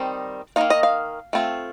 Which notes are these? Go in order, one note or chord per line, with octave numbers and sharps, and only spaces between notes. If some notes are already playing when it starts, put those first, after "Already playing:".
Already playing: D#3 G3 C4 D#4
D#3 A#3 D#4 F5
D#5
F5
A3 C4 F4